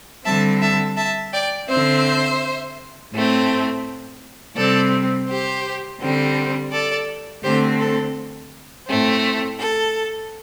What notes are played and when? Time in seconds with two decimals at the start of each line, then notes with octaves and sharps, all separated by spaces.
0.25 D3 G3 C4 E5 A5
0.61 E5 A5
0.96 E5 A5
1.32 D5 G5
1.68 D3 C4 C5 E5
3.12 A2 A3 C4
4.56 C3 G3 C4 A4 D5
5.28 G4 C5
6.00 D3 G3 C4
6.71 A4 D5
7.43 D3 A3 C4 G4 C5
7.79 A4
8.87 A2 A3 C4
9.59 A4